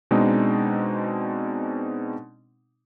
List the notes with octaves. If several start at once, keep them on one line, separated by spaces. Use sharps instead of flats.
B2 G#3 C4 D4 D#4